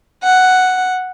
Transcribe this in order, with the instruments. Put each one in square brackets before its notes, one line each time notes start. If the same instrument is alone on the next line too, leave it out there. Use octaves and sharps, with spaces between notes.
[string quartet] F#5